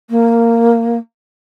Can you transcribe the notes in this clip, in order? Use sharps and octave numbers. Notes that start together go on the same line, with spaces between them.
A#3